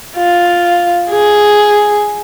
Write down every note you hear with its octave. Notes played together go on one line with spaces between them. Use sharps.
F4
G#4